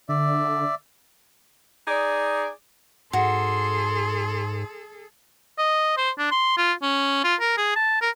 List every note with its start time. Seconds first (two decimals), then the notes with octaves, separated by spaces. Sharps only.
0.09 D3 D5 E5
1.88 D#4 G#4 D5
3.13 G#2 F#4 G#4 A4 C6
5.58 D#5
5.97 C5
6.18 D4
6.31 C6
6.57 F4
6.82 C#4
7.24 F4
7.40 A#4
7.57 G#4
7.76 A5
8.01 A#4